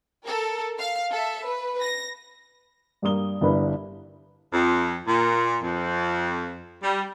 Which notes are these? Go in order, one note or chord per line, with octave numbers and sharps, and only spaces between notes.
A4 A#4
F5
A4 E5
B4
A#6
G2 G3 A#3 D#6 G7
G1 G2 G3 E4 B4 B5
F2
A#2
F2
G3